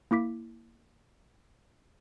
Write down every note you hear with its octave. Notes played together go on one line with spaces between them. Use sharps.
A#3 E4 D6 B6